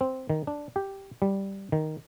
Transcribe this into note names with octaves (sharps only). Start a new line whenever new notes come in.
C4
D#3
D4
G4
G3
D#3